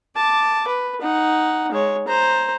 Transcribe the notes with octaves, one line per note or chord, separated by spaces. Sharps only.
A5 D6
B4
D#4 F#5
G#3 C#5
C5 A#5